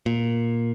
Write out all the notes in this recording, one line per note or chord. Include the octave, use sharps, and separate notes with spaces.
A#2